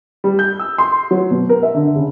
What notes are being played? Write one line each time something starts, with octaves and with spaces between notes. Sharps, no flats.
G3
G6
E6
C6
F#3
B2
A#4
E5
D3
C#3